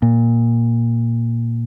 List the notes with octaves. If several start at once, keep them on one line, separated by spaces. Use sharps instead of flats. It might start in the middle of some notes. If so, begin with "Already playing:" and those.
A#2